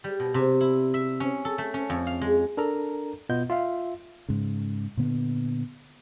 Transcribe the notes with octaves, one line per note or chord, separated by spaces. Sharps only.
G3
B2
C3
E4
E5
C#4
A4
A3
C#4
F2
F5
G#3
D4 A4 A#4 A#5
B2 B3 F4 D#5 G6
F4 E5 F5
G#2 C#3
A#2 D3 B3